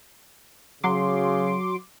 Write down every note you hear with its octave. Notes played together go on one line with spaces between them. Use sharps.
C#3 F#3 C6 D6